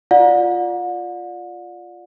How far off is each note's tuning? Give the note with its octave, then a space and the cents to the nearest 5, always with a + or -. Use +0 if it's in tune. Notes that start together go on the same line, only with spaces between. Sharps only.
F4 +0 D5 +0 F#5 -45